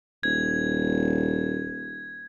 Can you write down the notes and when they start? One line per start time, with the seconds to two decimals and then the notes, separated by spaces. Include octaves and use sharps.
0.23 D#1 G#6